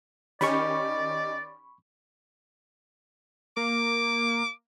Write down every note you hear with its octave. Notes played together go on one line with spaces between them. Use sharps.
D#3 C#4 G4 D5 D#5 B5 C#6
A#3 D6